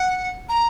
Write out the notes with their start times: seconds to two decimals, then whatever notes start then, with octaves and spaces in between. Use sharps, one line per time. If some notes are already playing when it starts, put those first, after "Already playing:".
Already playing: F#5
0.49 A#5